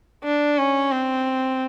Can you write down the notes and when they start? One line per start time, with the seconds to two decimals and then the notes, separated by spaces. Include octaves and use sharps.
0.24 D4
0.58 C#4
0.91 C4